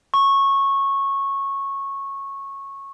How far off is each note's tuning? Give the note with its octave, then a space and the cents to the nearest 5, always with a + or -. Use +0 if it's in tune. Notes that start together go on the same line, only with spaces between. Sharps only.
C#6 -15